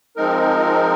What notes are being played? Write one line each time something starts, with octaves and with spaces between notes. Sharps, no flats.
F3 G#3 C4 D#4 A#4